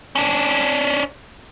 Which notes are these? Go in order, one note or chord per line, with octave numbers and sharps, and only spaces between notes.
C#4 D4